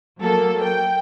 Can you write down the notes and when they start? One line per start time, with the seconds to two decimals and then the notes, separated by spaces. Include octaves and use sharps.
0.19 F#3 A#3 A4
0.63 G5